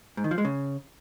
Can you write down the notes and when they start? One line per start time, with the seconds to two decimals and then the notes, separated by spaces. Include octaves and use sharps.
0.17 G#2
0.24 D#3
0.31 F3
0.38 G#3
0.45 C#3